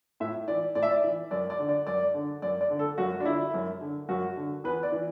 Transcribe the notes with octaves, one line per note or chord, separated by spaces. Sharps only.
A2 E5
E3 D5
A2 D5
E5
D5
E3
F#2 D5
D5
D3
D5
F#2 D5
D3
F#2 D5
D5
D3
A4
F#2 F#4
D4
D3 E4
F#2
D3
F#2 F#4
D3
E2 B4
D5
E3